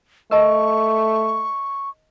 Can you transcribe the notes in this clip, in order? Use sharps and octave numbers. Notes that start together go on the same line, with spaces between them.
A3 A#4 D#5 A5 C#6